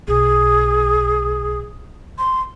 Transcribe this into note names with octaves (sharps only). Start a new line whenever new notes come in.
B1 G#4
C6